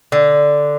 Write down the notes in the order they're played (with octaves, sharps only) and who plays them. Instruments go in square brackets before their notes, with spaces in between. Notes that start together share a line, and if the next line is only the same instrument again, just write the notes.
[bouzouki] D3